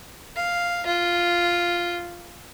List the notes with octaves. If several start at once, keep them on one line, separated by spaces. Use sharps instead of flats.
F5
F4